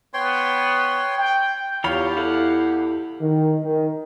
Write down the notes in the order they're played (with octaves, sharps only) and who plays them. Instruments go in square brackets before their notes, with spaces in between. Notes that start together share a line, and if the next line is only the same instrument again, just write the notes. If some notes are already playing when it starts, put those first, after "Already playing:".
[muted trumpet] B3 [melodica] C#5 G5 C6
[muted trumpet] G5
[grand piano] E2 B5 [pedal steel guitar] F4 C#5 F5 [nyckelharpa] G4
[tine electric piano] E4 A4 [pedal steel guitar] F5 F#5
[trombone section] D#3
D#3